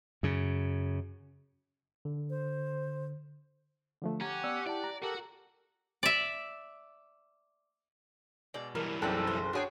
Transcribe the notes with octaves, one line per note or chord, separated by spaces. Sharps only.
F#2 C#3
D3
C5
D3 F3 A3
C#4 G4 F#5 A#5
B3 D5 E6
E4 D5 A5
A#5
F#4 G4 A4 A#4 F#5
D5 E5
B2 G#3 D5
E3 G3 A#4
F#1 B1 C4 A4 D5 G5
C5
D4 F#4 G#4 C#5 G5